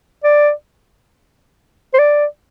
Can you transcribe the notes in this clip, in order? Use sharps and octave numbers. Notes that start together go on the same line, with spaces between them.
D5
C5
D5